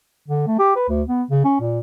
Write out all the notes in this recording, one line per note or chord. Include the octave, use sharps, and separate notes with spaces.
D3
A3
G4
B4
D2
B3
C#3
C#4
A#2